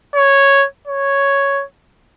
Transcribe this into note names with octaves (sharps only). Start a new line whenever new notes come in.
C#5
C#5